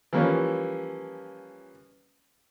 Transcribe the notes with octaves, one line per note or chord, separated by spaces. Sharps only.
E3 F3 G3 A#3 C#4